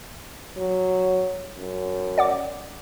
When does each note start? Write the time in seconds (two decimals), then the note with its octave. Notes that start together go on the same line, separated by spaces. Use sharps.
0.57 F#3
1.58 F#2
2.18 D5 F#5 D6